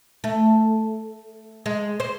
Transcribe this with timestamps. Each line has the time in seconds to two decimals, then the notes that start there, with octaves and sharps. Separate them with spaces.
0.24 A3
1.66 G#3
2.00 C5